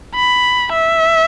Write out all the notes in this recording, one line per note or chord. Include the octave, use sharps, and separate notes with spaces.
B5
E5